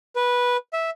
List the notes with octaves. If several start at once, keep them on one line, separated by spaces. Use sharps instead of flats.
B4
E5